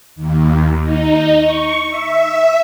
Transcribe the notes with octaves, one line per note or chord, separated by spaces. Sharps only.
D#2
D#4
C#6
E5